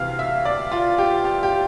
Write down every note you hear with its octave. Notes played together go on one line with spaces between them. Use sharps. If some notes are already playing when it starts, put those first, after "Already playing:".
Already playing: D2 C3 E3 F5
E5
D5
F4
G4
G4
G4